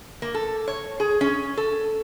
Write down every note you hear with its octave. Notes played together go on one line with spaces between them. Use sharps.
A#3
A4
C#5
G#4
C#4
A4